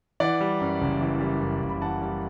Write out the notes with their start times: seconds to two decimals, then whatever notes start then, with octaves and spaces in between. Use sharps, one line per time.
0.20 E3 D5 F#5
0.40 G3
0.61 F#2
0.81 F#1
1.01 E3
1.21 G3
1.41 F#2
1.62 F#1
1.69 B5
1.82 E3 F#5 A5
2.02 G3